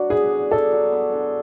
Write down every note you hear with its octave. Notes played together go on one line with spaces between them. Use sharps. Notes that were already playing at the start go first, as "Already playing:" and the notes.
Already playing: F#3 D4 F#4
B3 G#4
D3
D4 A4
F#3
B3
D3